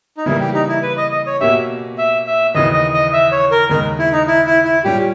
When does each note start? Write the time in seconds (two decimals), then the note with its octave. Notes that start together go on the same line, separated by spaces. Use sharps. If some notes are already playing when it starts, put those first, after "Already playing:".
0.17 D#4
0.26 C#3 E3 G3 A#3 E4
0.40 G4
0.54 D#4
0.68 E4
0.83 B4
0.97 D#5
1.12 D#5
1.27 C#5
1.41 B2 A#3 C#4 G4 E5
1.98 E5
2.27 E5
2.55 D#2 C#3 E3 D#5
2.74 D#5
2.93 D#5
3.13 E5
3.32 C#5
3.51 A#4
3.69 D#2 C#3 G#3 A#4
3.99 E4
4.12 D#4
4.27 E4
4.47 E4
4.65 E4
4.84 A#2 G3 C#4 G4